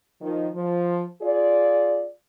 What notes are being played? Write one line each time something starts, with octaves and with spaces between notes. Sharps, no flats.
D#3 F3
F3
F4 G#4 D5